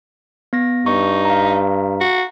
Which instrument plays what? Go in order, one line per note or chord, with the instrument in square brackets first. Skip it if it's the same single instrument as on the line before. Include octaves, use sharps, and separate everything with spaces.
[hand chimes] B3 A#6
[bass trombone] G2 [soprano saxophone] D#4 [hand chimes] C#6
[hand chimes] F5 A#5
[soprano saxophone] F#4